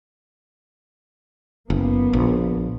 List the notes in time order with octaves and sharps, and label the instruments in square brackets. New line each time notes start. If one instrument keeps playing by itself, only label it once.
[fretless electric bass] F#1 [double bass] A#3 B3
[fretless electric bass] A#1